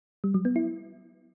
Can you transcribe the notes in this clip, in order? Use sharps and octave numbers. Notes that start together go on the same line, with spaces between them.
G3
F#3
B3
E4